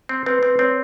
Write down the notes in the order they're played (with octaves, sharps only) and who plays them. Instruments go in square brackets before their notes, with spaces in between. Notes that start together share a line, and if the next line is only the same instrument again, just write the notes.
[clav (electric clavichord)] C4
[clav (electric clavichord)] C4 [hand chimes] B4
[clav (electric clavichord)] C4
[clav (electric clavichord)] C4 [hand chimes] C#5